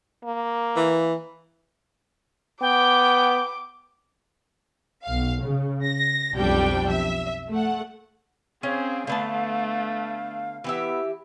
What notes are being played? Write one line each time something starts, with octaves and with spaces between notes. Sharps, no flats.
A#3
E3
B3 G5 D6
B1 F5
C#3
A#6
B1 F2 G3 D4 G5
E5
A3 F#5
C4 C#4 G#4 F5
D3 A3 B3 A5
E3 B3 G4 E5